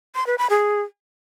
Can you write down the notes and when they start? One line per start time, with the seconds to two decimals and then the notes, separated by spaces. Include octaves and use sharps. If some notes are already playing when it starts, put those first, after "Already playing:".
0.15 C6
0.27 B4
0.38 B5
0.50 G#4